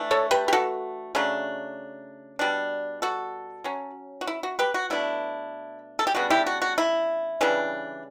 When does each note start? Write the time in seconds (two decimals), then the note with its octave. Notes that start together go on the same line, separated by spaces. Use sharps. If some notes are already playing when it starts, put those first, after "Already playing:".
Already playing: E3 A3 D4
0.11 A4 C#5
0.31 G4 B4
0.48 G4
0.53 F#4 A4
1.15 C#3 F#3 A3 D4
2.39 B2 G3 D4
3.02 F#4 A4
3.64 F#3 C#4
4.21 F#4
4.27 E4
4.43 F#4
4.59 G4 B4
4.74 F#4
4.90 B2 A3 D4 E4
5.99 A4
6.07 G4
6.15 C#3 G3 B3 D4 F#4
6.30 E4 G4
6.47 F#4
6.62 F#4
6.78 E4
7.41 C#3 E3 G3 D4